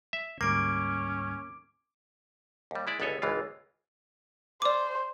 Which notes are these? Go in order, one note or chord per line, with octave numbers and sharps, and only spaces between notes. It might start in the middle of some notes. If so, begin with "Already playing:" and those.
E5
D2 G#2 G3 A#3 C#4 D6 D7
D#2 G3
G#3 E4 D5
G1 C#2 B3 A4 C#5 G#5
G#1 C#2 E3 G#3 F4
C5 D5 D6